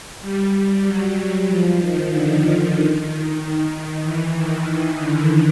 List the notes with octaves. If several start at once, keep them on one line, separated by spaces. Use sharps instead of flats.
G3
F#3
F3
D#3
D3
D#3
E3
D#3
D#3
D3